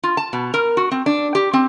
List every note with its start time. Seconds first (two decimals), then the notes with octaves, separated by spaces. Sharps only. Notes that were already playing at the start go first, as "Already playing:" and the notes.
0.03 F4
0.17 A5
0.33 B2
0.54 A#4
0.77 F#4
0.91 C4
1.06 D4
1.35 G4
1.53 C4